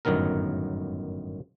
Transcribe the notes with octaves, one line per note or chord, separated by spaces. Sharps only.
G1 F#2 A2 D#3 B3 A#4